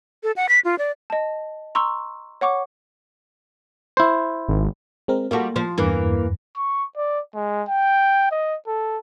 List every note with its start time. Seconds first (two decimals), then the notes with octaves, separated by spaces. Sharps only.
0.23 A4
0.36 F#5
0.49 B6
0.65 F4
0.78 D5
1.10 D#5 A5
1.75 A#5 C6 C#6 E6
2.41 C#5 F#5 C#6 D6
3.97 E4 C5
4.49 G#1
5.08 G#3 C4 A#4
5.31 G3 A#3 F4 F#4 A4
5.56 F3 C5
5.78 E2 G2 E3 A#3
6.57 C#6
6.97 D5
7.35 G#3
7.69 G5
8.32 D#5
8.67 A4